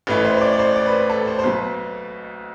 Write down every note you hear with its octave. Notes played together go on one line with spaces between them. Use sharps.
A1 A2 E3 B4
C5
C5
D5
D5
C5
D5
B4
C5
A4
C5
C5
B1 B2 B4